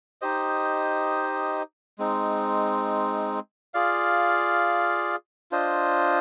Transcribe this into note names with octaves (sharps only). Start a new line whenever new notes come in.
D#4 G4 C5 D#5
G#3 C4 D#4
F4 G#4 D5 F5
D4 F4 C5 D#5